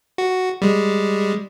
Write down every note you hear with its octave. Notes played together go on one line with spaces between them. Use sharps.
F#4
G3 G#3